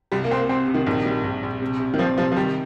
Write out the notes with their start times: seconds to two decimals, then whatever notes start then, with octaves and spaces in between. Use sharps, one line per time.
0.12 C2 G3
0.24 A#3
0.31 C2 C4
0.37 A#3
0.49 C3 C4
0.68 C3
0.74 D#3
0.86 A#1 D#3
1.05 G3
1.24 A#1
1.43 A#1
1.62 C3
1.80 C3
1.94 D#3
1.98 F3 C4
2.18 C3 F3
2.32 F3
2.36 D#3 G3